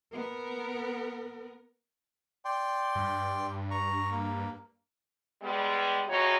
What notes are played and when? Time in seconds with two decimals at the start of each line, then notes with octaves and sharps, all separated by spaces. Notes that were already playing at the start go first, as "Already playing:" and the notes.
0.13 B3 A#4
2.45 D5 G5 C6
2.96 G2
3.71 A#5 C#6
4.11 A#3
5.42 G3 G#3 B3
6.08 F2 C#3 E3 D#4 F#4 C#5